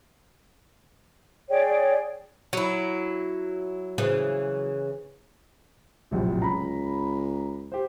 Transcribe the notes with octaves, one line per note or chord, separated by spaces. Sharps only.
G#4 C#5 D5 G5
F#3 E4
C#3 E3
D1 A#1 C3
C#2 A#5 B5
G4 C5